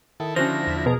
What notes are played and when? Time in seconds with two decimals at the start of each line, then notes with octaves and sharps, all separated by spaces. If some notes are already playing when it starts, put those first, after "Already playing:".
0.20 D#3 E4 A4
0.36 D3 F3 C#4 E4 F#4 C5 A#6
0.67 E2 E5 B6
0.86 B2 G#4 A#4 A#5